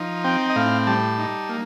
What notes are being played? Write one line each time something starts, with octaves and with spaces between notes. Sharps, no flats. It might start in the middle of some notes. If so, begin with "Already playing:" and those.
Already playing: F3 D#4
C4 G5
D#5
A2 F5
G3 A5
D#4
A#3